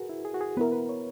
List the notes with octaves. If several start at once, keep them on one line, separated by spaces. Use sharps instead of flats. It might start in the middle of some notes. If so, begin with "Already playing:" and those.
Already playing: F#4 G#4 A#4 B4
E4
G#4
F#4
G#4
B3 E4 A#4 B4
B4
C#5